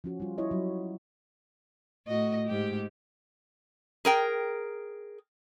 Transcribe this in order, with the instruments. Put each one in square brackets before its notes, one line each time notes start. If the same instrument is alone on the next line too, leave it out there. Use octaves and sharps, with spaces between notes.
[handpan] F3 C#4 F#4
G3 F4
E4 C#5 D#5
F#3
[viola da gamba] A2 F#4 D#5
G#2 G4
[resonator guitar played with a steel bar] G#4 A#4 G5